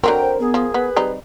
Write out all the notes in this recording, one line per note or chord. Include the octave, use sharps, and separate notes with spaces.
D3 F#3 C4 A#4 G5
C5
B3 G#4
F3
B3 B4
G3 C4 D#4